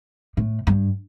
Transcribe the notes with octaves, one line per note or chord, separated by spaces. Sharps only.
A2
G2